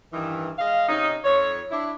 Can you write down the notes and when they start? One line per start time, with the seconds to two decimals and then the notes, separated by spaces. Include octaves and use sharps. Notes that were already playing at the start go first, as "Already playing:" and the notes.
0.13 G2 D#3 E3
0.59 G#3 D#5 F5
0.89 C3 C#4 D#4
1.25 F2 C#5
1.71 D4 E4